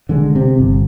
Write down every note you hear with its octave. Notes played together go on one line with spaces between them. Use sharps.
D3 G#3
C3
G1